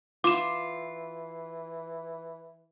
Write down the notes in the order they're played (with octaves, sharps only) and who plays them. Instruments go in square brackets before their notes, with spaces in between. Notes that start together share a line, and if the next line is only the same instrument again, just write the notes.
[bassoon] E3 [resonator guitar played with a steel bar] F4 [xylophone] D6 E7